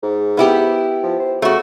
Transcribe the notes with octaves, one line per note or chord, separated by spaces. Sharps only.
G#2
B3 E4 G4
F3
C5
C#3 A3 F#4